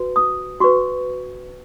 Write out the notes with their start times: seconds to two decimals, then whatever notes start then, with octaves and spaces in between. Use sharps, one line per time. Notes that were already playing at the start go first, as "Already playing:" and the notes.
Already playing: F#4 B4
0.16 D#6
0.60 F#4 B4 C#6